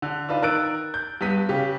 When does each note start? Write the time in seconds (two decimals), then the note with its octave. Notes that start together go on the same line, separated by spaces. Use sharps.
0.02 D3
0.29 D4 D#4 F4 B4
0.42 D#3 A#4 E6 F#6 A6 D7
0.94 G6
1.21 G2 B3 B6 D#7
1.49 C#3 G4